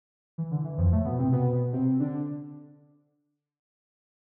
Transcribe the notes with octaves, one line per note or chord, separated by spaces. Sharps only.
E3
D3
E3
F2 F3
A2 A3
B2 B3
C3 C4
B2 B3
B2 B3
C3 C4
D3 D4